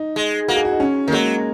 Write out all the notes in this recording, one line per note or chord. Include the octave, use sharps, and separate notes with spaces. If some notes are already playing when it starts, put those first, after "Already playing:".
Already playing: D#4
G#3
A#3 F#4
G#4
F#4
D#4
C#4
D#3 A#3
F#3 G#3